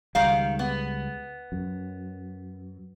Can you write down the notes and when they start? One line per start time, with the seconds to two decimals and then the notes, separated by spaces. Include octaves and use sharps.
0.15 C#2 D#3 G3 G#3 F5
0.59 B3
1.52 F#2